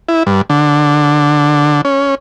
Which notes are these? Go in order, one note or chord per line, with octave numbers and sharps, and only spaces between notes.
E4
G2
D3
C#4